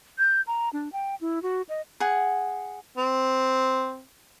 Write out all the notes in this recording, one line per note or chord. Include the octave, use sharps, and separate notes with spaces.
G6
A#5
D4
G5
E4
F#4
D#5
G#4 F#5
C4